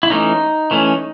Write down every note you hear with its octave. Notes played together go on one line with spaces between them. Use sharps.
E4
E3 A3 C#4 D#4
E3 A3 C#4